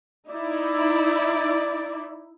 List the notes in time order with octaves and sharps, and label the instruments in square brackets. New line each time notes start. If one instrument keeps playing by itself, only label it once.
[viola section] D#4 E4 [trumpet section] D5